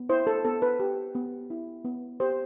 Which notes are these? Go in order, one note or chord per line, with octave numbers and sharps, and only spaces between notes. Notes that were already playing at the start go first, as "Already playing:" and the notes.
Already playing: B3
E4 C5
A4
B3 A4
B4
G4
B3
E4
B3
G4 C5